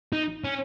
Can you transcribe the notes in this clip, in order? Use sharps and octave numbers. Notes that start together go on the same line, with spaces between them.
D#4
C#4